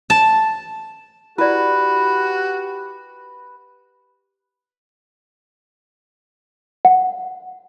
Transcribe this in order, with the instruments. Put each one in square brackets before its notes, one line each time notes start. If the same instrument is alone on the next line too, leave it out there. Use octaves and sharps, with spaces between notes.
[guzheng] A5
[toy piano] E4 D5 [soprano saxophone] F#4 [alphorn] G4 [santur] B4
[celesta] F#5